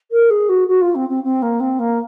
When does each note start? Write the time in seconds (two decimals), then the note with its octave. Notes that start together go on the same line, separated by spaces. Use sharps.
0.11 A#4
0.30 G#4
0.49 F#4
0.68 F#4
0.81 F4
0.95 C4
1.09 C4
1.23 C4
1.42 A#3
1.60 C4
1.79 A#3